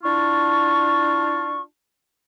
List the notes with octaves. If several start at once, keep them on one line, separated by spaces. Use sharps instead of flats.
D4 E4 F4 A5 C#6